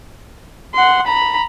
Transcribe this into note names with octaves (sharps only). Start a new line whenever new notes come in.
F#5 C6
A#5 B5